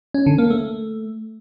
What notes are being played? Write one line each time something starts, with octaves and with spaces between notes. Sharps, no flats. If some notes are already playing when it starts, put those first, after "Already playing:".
C#4
D3
A#3
A3